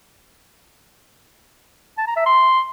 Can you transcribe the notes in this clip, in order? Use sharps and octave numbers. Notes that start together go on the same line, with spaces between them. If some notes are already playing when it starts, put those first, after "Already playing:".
A5
A#5
E5
C6